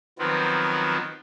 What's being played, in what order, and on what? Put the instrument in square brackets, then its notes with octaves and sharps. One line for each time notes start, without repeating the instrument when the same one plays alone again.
[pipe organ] D#3 F3 F#3 B3 C4